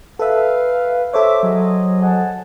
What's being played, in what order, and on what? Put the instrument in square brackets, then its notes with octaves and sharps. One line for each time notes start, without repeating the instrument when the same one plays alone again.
[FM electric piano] A4 E5 [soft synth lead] B4 [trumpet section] F5
[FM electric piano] A4 C5 C#5 [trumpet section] E5 [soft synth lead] D6
[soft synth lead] F#3 [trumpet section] G#4 D#5
[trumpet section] F#5 G#5 A5